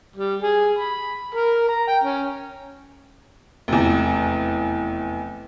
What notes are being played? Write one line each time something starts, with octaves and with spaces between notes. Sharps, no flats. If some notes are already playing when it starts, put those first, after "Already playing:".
G3
G#4
B5
A#4
A#5
G5
C#4
F1 E2